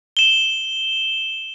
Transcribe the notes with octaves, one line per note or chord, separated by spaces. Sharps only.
E7 G7